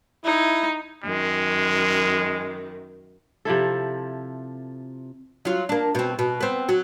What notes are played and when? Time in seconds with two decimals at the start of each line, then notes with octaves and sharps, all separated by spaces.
0.25 D#4 E4
1.04 F#2 D#3 G#3
3.45 C3 F3 E4 A4
5.45 F#3 F4
5.69 A#3 D4
5.95 B2 C4
6.19 B2
6.41 B3 C4
6.69 F#3